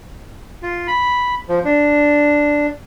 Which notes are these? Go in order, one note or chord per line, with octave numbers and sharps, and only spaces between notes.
F4
B5
F3
D4